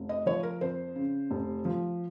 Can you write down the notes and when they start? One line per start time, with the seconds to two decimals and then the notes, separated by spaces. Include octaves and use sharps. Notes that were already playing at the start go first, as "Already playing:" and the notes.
Already playing: F1
0.09 D#5
0.26 F3 C#5
0.43 A#4
0.61 F2 C5
0.95 C#3
1.30 F1
1.65 F3